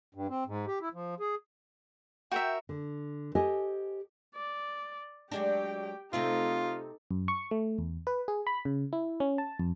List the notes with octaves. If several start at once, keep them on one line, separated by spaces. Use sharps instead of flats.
G2
C4
G#2
G4
E4
F3
G#4
F#4 A#4 E5 G5
D3
G4 A4 C5 D#5 F#5 G#5
D5
F#3 G#3 D4 G4 G5
C3 A3 C4 D#4 F4 A4
F#2
C#6
A3
E2
B4
G#4
B5
C#3
E4
C#4
A5
F2